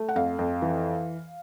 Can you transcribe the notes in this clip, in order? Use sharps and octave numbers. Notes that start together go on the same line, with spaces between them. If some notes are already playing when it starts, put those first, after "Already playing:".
Already playing: A3
F#5
F2 F5
F2
E3